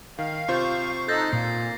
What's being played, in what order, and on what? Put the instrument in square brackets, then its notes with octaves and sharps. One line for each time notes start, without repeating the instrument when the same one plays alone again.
[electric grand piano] D#3 [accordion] F5
[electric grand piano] C3 F4 C5 [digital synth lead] C#6 [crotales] G6 C7
[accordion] D#4 A4 [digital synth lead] F#6 [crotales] G6 A6 A#6
[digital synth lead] A#2 [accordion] A#3 [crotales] C7